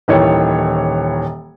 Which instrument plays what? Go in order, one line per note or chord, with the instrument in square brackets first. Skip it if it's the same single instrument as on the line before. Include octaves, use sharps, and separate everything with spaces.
[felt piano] D#1 D#3 E3 C#5